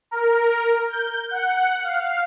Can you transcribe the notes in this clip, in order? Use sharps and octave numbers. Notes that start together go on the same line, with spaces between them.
A#4
G6
F#5
F5